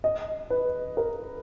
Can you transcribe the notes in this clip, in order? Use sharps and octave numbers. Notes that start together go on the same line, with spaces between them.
D#5
B4
A#4